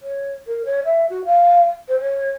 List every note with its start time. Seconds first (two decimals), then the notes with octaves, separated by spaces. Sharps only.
0.01 C#5
0.47 A#4
0.65 C#5
0.85 E5
1.10 F#4
1.25 F5
1.88 C5
2.01 C#5